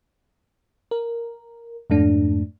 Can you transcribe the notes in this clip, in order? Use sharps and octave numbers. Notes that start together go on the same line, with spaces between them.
A#4
F2 G#2 A3 D4